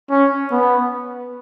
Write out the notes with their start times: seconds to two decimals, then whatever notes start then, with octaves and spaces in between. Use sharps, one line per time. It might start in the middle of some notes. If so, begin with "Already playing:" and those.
0.11 C#4
0.51 B3